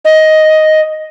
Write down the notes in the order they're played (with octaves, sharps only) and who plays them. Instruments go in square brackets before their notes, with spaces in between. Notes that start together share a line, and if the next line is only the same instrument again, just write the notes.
[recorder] D#5